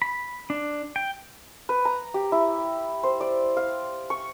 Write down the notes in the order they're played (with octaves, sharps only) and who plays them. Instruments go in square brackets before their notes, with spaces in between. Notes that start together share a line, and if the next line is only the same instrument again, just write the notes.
[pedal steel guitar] B5
D4
G5
[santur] B4
A#5
G4
E4
C5
D5
F5
C#6